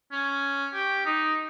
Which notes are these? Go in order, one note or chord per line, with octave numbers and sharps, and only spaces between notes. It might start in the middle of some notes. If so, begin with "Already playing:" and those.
C#4
G4
D#4